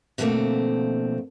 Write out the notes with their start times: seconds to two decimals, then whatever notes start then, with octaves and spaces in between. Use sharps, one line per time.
0.18 B2 D3 F3 A3 A#3 C4